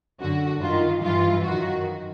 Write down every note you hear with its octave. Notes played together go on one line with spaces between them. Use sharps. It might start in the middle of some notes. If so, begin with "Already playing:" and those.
F#2 D3 F#4
G2 D#3 F4
G2 E3 F4
F#2 D#3 F#4